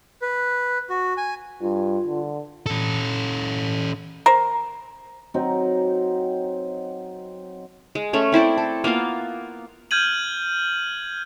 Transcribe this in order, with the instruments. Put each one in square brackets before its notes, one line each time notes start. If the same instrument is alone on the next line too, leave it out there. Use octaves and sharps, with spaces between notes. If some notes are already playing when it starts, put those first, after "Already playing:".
[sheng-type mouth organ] B4
F#4
G#5
[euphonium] G2 [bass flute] F4
[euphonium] D3
[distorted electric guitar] C#4 A4
[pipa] A#4 C5
[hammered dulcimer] F#3 C4 D#4
[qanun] G#3
A3 C#4 A4
C4 E4 C5 D5
A4
A#3 B3 F4 F5
[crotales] F6 G6 G#6 D#7 F#7